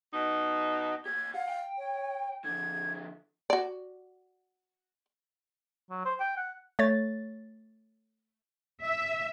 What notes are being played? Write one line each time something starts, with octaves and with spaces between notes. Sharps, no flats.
B2 D#4
G4 C#5 G#6
F5 F#5
G5
C#5
D3 F3 G#6
F#4 D5
F#3
C5
G5
F#5
A3 C#5 A6
E5